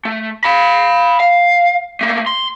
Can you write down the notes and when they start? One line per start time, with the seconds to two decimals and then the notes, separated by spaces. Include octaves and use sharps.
0.05 A3
0.44 F5 B5
1.20 F5
2.01 A3 A#3
2.26 C6